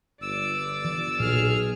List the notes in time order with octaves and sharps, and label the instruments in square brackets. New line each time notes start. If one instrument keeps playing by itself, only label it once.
[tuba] G1 [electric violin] D5 D6 [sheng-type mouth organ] E6
[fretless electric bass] E3
[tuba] B1 [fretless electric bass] A#2 [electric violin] G#4 F6